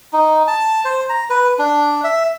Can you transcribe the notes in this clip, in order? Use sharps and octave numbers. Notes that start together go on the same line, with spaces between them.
D#4
A5
C5
A#5
B4
D4
E5